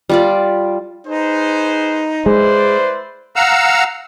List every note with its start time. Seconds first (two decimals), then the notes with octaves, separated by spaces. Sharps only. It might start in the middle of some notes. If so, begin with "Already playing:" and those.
0.09 G3 F4 D5
1.07 D#4 G#4 B4 C5
2.26 G#3 E4 B4 C5 D5
3.36 F5 F#5 A#5 E6